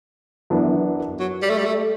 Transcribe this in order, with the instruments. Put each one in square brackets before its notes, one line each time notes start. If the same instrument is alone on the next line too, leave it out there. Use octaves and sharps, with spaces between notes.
[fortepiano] F#2 E3 B3 D4
[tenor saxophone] F#3
G3
A3
G3
A3